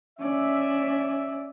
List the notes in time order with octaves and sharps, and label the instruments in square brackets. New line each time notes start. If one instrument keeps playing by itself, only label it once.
[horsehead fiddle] C#4 D5 [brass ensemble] E5